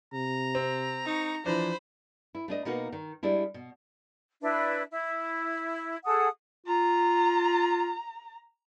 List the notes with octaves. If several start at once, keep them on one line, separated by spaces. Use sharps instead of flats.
C3 A#5
C4
D#4 C#6
E3 F3 D4 C5 B5
E4
A3 D4 D#5
B2 A#3 D#4 F#4
D#3
G3 G#3 D4 E4
B2
D4 E4 B4 E5
E4
G#4 A4 F#5 D#6
F4 A#5